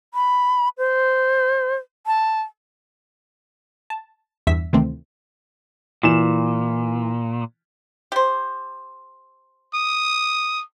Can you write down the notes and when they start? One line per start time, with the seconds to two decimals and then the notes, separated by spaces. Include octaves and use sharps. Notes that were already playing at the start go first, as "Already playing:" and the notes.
0.14 B5
0.78 C5
2.07 A5
3.90 A5
4.47 E2 G2 E5 B6
4.73 D2 C3 D#3 E3 A3 C4
6.03 A#2 E3 E7
8.12 G4 C5
9.74 D#6